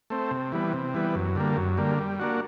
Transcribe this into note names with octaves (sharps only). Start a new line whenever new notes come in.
A3 C4
C3
E3 G3 B3
C3
E3 G3 B3
F#2
D3 G3 A#3
F#2
D3 G3 A#3
G3
A#3 D4 F#4